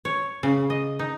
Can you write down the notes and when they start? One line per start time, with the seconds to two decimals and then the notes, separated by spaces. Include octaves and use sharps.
0.05 C#5
0.43 C#3
0.70 D#5
0.99 D#4